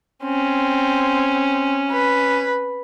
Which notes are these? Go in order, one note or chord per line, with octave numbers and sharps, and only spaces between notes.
C4 C#4
B4